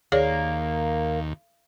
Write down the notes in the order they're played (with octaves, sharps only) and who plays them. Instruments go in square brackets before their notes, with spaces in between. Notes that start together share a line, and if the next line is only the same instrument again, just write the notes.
[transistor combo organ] D#2 [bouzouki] A#3 [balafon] G#4 C#5 D5